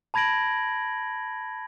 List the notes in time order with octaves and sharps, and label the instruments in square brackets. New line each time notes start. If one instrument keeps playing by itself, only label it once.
[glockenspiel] A5 B5 G#6 A#6 D7 F#7